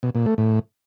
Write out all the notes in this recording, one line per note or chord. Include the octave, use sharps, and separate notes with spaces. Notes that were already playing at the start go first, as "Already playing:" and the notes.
B2
A#2
A3
A2